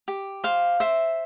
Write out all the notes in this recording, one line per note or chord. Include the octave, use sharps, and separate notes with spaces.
G4
C5 F5
C5 E5